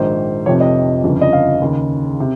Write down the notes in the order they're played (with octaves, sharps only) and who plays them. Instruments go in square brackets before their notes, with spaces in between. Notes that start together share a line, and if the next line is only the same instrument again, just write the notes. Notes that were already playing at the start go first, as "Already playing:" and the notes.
Already playing: [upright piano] A#1 G#2 D#3 C5
F1 F2 C3 C#5
D#5
G1 F2 C#3
D#5
F5
D#2 C#3
C3